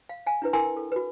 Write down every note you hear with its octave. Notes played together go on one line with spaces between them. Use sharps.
F5
F5 G#5
D4 E4 B4
E4 A#4 G5 G#5 C6 E6
A4
F#4 B4